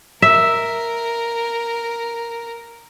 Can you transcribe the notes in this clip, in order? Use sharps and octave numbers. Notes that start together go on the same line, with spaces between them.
A#4 E5